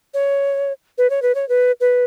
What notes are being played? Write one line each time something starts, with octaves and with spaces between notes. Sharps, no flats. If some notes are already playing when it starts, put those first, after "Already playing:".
C#5
B4
C#5
B4
C#5
B4
B4